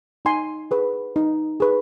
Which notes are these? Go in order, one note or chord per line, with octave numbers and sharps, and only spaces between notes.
D#4 G#5 C6
G#4 B4
D#4
G#4 B4